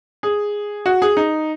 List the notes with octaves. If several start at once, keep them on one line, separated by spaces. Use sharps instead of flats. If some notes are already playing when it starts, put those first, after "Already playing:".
G#4
F#4
G#4
D#4